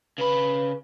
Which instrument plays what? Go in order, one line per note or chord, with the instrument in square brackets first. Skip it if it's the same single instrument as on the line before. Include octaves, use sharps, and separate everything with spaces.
[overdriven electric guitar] C#3 B5 [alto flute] B4